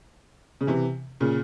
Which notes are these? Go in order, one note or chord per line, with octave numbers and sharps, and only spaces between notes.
C#3
C3 E3
A#2 C#3